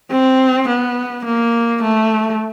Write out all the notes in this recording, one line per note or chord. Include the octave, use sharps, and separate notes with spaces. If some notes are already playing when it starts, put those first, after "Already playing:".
C4
B3
A#3
A3